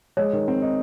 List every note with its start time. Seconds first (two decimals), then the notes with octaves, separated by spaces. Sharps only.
0.17 G#3 C#5
0.33 D#3
0.48 C4
0.62 D#4